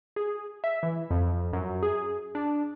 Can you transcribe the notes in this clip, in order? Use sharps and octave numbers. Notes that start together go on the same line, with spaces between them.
G#4
E5
E3
F2
F#2
G#4
D4